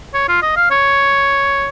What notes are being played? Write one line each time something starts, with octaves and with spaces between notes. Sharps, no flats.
C#5
F4
D#5
F5
C#5